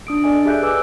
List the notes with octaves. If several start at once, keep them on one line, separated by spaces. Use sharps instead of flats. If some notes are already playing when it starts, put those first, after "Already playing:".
D4 D#6 D7
A4 D5 D#5 G#5
G4 G#4 E5 F#6 G6 D7
G#4 B4 G#5 D6 E6